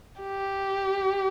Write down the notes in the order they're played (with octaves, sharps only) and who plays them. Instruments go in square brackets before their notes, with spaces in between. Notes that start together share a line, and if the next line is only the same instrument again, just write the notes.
[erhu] G4